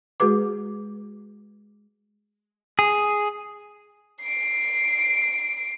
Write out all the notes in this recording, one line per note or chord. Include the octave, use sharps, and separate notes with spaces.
G#3 F#4 G#4 B4 D6
G#4
C7 D7